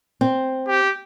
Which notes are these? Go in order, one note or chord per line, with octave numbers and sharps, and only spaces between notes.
C4
G4